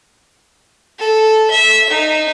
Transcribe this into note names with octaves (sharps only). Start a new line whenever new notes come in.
A4
E5
D#4